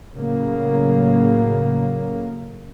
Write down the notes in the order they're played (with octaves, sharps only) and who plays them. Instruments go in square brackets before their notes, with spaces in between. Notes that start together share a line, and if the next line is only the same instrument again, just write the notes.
[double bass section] A2 C#3 F#3 A#3